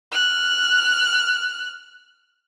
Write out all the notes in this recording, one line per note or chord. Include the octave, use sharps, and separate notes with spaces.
F6 F#6